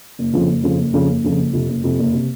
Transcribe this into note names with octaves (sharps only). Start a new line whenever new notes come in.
F#1
F2 C#3 F3
F#1
F2 C#3 F3
F#1
F2 C#3 F3
F#1
F2 C#3 F3
F#1
F2 C3
F#1
F2 C3
F#1
C3